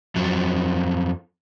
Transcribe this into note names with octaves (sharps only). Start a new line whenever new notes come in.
F2 F#3